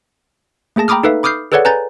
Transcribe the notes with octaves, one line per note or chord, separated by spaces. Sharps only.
A3 A#3 G#4 A5 A#6
G5 A#5 B5 D6 D#6 F6
D#4 A4 B4 E5 F5
B5 D6 D#6 F6 G6 C7
G#4 A4 B4 C#5 D5 F#5
B4 G#5 A#5 G6 A6